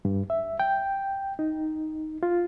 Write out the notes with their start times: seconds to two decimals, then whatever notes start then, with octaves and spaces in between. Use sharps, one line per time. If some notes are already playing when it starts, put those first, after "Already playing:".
0.05 G2
0.30 E5
0.60 G5
1.39 D#4
2.23 F4